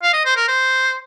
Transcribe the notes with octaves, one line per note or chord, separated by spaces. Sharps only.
F5
D#5
C5
A#4
C5